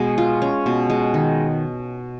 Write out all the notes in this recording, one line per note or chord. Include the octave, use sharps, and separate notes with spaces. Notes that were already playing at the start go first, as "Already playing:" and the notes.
Already playing: B2 G#3
F4
C#4
B2
G#3
D#3